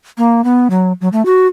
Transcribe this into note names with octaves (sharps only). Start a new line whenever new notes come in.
A#3
B3
F#3
F#3
A3
F#4